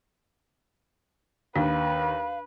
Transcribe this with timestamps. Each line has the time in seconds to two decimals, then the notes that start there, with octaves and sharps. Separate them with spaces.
1.56 D#2 D4 B4 F5